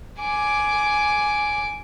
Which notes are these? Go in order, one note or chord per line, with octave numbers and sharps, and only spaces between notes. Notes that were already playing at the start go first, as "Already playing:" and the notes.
G#5 D6